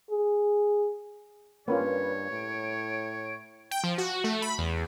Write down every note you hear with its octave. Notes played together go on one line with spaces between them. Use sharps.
G#4
G2 A#3 C#4 F4 B4 C#5
A2 D7
G5
F3
F#4
A3
B5
E2